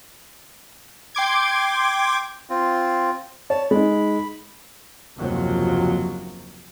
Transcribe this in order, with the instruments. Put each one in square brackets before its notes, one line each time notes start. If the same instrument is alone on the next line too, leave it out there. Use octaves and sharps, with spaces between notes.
[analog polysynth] G5 C6 D6 G#6
[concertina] C4 F4
[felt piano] C#5 [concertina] A5
[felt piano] G#3 D#4 [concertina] B5
[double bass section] F#1 D#2 C3 F3 F#3